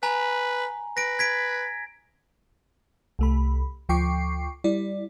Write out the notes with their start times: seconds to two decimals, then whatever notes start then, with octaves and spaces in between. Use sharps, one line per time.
0.03 B4 G#5 A#5
0.97 B4 A#6 D7
1.19 G#6 B6 D7
3.19 C2 A3 B5
3.89 D2 F3 G5 C#6 D6 C7
4.64 G3 E4 D5